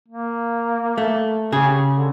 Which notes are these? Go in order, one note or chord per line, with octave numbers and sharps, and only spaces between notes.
A#3
A3
C#3 G4 G#4
D3